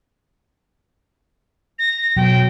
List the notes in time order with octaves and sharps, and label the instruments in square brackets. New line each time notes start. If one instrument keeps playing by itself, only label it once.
[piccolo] A#6
[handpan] B2 F#3 [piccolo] G5